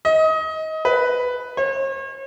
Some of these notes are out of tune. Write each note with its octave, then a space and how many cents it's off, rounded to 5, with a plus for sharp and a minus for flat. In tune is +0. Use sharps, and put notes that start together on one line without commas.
D#5 +25
B4 +5
C#5 -45